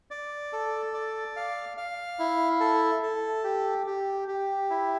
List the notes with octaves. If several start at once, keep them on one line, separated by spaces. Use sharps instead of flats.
D5
A4
D5
F5
F5
E4
A4
A4
G4
G4
G4
E4